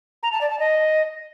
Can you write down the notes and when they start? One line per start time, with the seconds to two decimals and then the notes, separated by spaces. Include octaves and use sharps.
0.23 A#5
0.32 A5
0.41 D5
0.50 A5
0.59 D#5